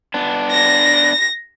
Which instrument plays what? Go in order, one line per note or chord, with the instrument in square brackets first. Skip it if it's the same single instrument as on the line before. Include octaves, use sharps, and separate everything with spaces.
[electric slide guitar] B3 D4
[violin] A#6